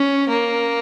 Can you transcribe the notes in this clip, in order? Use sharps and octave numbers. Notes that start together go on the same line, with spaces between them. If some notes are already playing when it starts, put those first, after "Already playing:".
Already playing: C#4
A#3